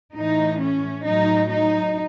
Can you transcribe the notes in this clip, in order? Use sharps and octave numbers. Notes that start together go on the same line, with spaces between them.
A2 E3 D#4
C#4
A2 F#3 D#4
D#4